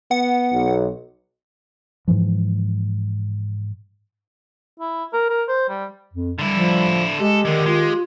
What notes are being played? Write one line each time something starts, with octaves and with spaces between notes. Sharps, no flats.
B3 F#5
B1
G#2 C#3 E3 F3
E4
A#4
A#4
C5
G3
F2
D3 G3 E4
F3
G#3 G4 A4 D#5
D3 D#3 G#3
G#3 F4